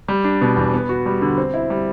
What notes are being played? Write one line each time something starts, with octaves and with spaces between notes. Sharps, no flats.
G3
D4
B2
E2
B3
F#4
G3
D3
C4
E4
G3